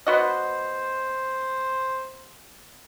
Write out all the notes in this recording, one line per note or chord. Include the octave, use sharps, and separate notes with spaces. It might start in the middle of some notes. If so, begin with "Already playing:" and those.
B3 F#4 C5 D#5